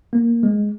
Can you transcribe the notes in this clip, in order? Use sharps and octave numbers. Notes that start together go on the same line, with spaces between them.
A#3
G#3